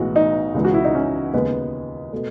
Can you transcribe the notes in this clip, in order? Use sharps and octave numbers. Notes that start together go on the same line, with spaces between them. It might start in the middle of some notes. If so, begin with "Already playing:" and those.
Already playing: B1 A2 E3 G#3 F#4
D#4
C#2 C#3 E3 G#3
F#4
E4
D#4
C#4
D#2 C#3 G#3 B3
B2 A3